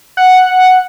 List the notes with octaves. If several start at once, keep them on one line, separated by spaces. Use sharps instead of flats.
F#5